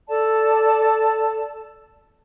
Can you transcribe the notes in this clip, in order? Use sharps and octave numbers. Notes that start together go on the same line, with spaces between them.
A4 D5 A5